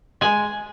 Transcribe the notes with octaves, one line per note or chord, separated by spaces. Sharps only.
G#3 G#5